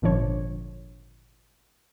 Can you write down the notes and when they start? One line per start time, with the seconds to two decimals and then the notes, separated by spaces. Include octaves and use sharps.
0.02 G#1 A#2 D3 F3 D4 C#5